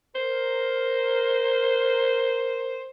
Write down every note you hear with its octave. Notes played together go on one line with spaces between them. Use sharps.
A#4 C5